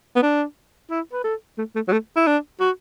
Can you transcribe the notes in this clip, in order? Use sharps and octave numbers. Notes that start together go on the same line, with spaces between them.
B3
D4
E4
B4
A4
A3
A3
F#3
A3
E4
D4
F#4